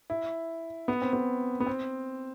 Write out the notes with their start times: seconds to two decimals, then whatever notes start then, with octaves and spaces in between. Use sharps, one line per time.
0.10 E4
0.88 B3
1.02 C4
1.13 B3
1.60 B3
1.66 C4